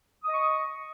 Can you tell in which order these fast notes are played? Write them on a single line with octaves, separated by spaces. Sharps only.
D#6 D#5 C#6